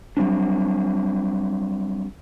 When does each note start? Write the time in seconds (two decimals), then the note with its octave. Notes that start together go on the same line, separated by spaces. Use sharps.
0.17 F#3 G3 C4 D4